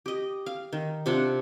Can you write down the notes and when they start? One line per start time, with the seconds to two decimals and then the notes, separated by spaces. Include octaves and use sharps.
0.06 G4 D#5
0.46 F5
0.73 D#3
1.06 C3 D4 F4 F#5